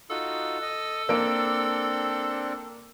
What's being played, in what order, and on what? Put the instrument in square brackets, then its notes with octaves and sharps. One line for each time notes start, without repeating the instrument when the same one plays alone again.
[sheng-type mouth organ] D#4 F4 F#4 [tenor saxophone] A4
[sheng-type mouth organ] D#5
[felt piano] A#3 D7 [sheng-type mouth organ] C4 D4